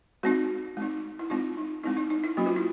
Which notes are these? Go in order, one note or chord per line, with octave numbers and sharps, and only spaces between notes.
G#3 C4 D#4 F#4
G#3 C4 D#4
E4
G#3 C4 D#4 F4
D#4
G#3 C4 D#4 E4
D#4
D#4
E4
F#3 A#3 C#4 F#4
F4
E4